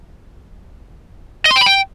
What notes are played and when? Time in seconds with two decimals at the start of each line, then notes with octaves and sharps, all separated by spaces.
1.46 D#5
1.51 C6
1.56 G5
1.61 B5
1.66 G5